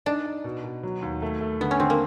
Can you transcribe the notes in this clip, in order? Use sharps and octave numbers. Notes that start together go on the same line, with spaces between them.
D4 D#4
D#4
B2
B2
F#3
D#2
A3
A3
D3 B3
C#4
D3 C4
A#3